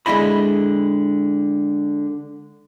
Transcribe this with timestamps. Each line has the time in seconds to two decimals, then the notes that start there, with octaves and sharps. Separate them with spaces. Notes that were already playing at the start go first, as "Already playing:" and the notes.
0.06 D3 G#3 E4 D#5 B5